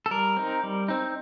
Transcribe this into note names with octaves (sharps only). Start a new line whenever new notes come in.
A4
G3 A#4
C4 D#4
G3
C4 D#4